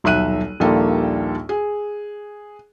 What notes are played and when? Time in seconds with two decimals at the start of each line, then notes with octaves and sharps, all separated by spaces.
0.04 D#1 B1 E5 F#6 D#7
0.60 A#1 D#2 G3 A#3 A4
1.49 G#4